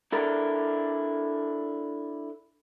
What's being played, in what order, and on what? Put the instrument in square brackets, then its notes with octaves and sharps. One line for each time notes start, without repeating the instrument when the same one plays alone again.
[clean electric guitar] D4 E4 A4 A#4